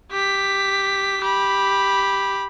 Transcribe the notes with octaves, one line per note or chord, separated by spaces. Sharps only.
G4 B6
G4 B5